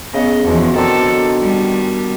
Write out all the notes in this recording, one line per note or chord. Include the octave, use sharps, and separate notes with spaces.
C#3 B3 D#5
E2 B2 F3 F#4
D#3 C4 D4 A4
G3